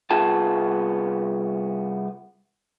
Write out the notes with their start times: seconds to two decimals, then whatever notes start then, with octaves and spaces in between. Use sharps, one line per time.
0.11 C2 B3 F4 G#4 A5